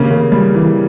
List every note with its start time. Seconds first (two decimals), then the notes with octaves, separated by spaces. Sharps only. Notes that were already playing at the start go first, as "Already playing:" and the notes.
Already playing: C#3 A#3
0.10 C#3
0.32 G3
0.54 E3